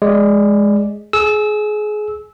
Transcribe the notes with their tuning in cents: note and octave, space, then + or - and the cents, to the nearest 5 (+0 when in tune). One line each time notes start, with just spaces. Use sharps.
G#3 +0 D5 +0
G#4 +25 E6 -20